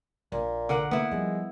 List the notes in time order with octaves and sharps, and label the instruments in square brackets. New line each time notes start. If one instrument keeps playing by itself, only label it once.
[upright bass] A#1 [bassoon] A#2
[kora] D3 A#4 F#5
[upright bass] A#3 [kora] B3 E4
[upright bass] F3 G3 [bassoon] G#3